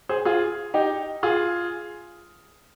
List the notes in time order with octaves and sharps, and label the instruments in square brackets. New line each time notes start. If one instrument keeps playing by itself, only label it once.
[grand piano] G#4 C5
F4 G#4
D#4 G4
F4 G#4